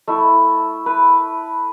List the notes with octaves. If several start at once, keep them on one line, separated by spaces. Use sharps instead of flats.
A3 E4
B4